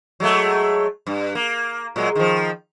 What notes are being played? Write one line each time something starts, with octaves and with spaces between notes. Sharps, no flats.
F#3 G#3 A3
G2
A#3
A#2 F#3 G#3
D#3 F3